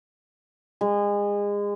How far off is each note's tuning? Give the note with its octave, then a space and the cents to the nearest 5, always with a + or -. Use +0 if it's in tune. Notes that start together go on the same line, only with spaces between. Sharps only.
G#3 -30